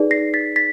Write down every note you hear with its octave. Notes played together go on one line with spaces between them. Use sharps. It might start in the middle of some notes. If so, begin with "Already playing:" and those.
Already playing: D#4 G#4 B4 D5
A#6 C7
A6 B6
A6 B6